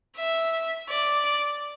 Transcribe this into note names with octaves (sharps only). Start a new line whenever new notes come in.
E5
D5